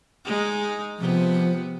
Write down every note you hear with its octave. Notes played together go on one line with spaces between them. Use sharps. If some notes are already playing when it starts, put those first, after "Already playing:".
G#3 D#4
C3 F3 B3